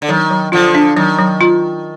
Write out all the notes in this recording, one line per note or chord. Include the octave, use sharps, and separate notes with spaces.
D3
D#3 F#3
F#3
D3 F3 F4
D4
D#3 F#3
F#3
F4